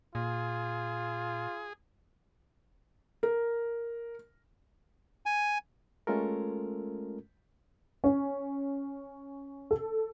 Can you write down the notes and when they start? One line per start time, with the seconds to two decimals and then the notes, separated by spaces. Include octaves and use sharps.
0.15 A#2 F4 G#4
3.23 A#4
5.26 G#5
6.07 G#3 A3 C#4 F4 A4 A#4
8.04 C#4
9.71 A4